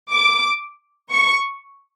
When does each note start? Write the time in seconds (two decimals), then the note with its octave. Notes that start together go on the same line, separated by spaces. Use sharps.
0.12 D6
1.11 C#6